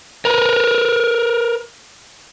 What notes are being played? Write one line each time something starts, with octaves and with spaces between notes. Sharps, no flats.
A#4 B4